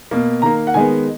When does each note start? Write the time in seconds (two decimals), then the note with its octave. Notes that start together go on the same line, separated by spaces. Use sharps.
0.11 B2 A#3
0.42 D#3 A#3 A#5
0.67 F#5
0.74 D#3 G#3 B3 G#5